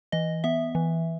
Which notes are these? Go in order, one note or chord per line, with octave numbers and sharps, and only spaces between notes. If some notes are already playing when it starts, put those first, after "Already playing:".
E3 D#5
B3 E5
E3